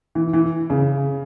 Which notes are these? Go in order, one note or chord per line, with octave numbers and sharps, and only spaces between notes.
E3
E3
C#3